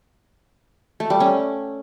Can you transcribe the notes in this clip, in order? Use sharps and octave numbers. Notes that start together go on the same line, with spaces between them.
A3
G3
C#4